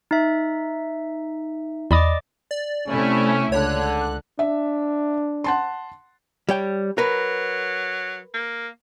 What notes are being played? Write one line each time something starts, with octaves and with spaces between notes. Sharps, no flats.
D#4 E5
E2 D5 D#5 B5 D6 D#6
D5
C3 A3 C#4 E4
C#2 D3 C#5 F#6
D4 E5
F#5 A5 C6
G3 C#5 G5
F#3 A#4 B4
A#3